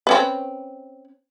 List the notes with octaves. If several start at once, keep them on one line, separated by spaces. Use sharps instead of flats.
C4 C#4 B4